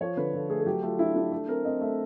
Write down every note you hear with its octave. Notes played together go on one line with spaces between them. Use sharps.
F3 C#5
D3 B4
F3 A4
A3 G#4
G#4
F#3 G4
A3 F4
D4 E4
D4 G4
A3
C4 A#4
C4 D#5
A3 E5